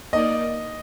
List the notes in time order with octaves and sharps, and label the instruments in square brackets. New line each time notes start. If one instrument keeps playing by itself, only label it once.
[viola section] A#3 D#4 A#4 D5 [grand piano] D#5